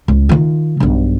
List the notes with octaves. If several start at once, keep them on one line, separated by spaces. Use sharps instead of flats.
C#2
D#3 F4
B1 G2